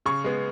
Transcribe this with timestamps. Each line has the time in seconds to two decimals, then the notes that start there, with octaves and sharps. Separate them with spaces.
0.06 C#3 C#6
0.24 G#3 B3